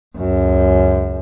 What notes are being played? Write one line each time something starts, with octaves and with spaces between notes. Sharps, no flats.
C#2 F#2